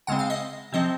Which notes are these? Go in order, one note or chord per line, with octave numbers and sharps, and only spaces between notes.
C#3 G#3 C4 F#5
F5
D#5
C3 F3 C4 D#5